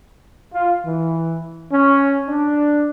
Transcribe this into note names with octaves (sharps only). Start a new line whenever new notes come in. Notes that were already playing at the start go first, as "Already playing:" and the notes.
F4
E3
C#4
D4